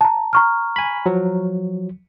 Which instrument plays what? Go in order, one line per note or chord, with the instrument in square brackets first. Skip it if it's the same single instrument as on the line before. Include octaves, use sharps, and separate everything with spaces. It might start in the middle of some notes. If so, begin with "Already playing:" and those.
[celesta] A5 A#5
A#5 C#6 F6
[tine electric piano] G#5 B5
F3 F#3